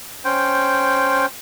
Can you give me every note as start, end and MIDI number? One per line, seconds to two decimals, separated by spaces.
0.25 1.26 61
0.25 1.26 72
0.25 1.26 79